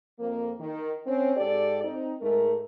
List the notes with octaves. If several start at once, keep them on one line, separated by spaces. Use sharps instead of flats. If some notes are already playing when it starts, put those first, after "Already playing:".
F2 A#3
D#3
C4 C#4
G#2 G4 A4 D5
C4 D#4
G#2 G#3 A3 A#4